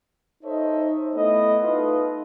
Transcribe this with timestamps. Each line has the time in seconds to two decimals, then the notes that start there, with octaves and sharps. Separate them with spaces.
0.44 D#4 A4 C5 C#5 D#5 E5
1.15 A3 B3 E4 D#5
1.62 D#4 F4 A4 B4 D#5